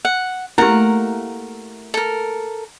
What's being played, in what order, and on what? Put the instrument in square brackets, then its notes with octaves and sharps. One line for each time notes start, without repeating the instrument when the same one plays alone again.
[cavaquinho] F#5
[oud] A3 A#3 [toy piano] E4 G4 [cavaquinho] A#4 F#5
[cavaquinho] A4 A#4